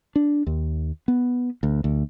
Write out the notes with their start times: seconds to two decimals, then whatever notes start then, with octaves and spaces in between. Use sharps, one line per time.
0.16 D4
0.47 D#2
1.08 B3
1.63 D2
1.84 D2